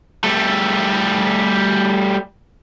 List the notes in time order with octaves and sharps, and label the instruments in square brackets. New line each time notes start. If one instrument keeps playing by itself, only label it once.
[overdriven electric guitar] G3 A3